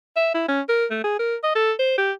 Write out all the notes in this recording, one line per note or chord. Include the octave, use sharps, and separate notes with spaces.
E5
E4
C#4
A#4
A3
G#4
A#4
D#5
A4
C5
G4